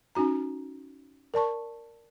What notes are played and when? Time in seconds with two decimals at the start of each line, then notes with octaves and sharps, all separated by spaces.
0.15 C#4 D#4 F#4 A#5
1.34 A#4 D5 A5 C#6